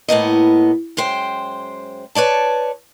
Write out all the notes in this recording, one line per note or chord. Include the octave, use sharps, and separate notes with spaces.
A2 A#3 B3 D#5
F#2 G#3 C5 G5
B4 C#5 D5 A5